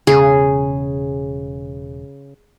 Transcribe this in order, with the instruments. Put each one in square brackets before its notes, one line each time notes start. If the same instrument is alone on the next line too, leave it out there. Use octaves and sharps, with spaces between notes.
[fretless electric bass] E1 [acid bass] C#3 [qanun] G#4